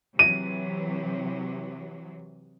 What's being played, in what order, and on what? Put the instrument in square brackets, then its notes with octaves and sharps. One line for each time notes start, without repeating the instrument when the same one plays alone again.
[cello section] C3 E3 F#3 [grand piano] D#7